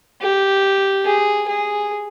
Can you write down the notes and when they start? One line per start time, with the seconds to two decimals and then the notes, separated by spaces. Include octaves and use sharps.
0.22 G4
1.05 G#4
1.48 G#4